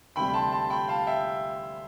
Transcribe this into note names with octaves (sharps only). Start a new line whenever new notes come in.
D2 C3 G3 G5 B5
B5
A5 C6
A5 C6
G5 B5
F5 A5
E5 G5